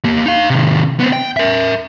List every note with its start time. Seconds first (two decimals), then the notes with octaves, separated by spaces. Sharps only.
0.05 A#3 G4
0.26 D#4 F5
0.50 C3 D#3
1.00 B3 C4
1.13 G5
1.37 A#4 E5